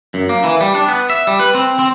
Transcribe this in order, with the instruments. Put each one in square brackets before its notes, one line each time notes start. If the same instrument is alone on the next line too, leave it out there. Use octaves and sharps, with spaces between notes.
[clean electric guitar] F#2
A#3
E3
G3
D4
B3
E5
G3
B4
C4
C4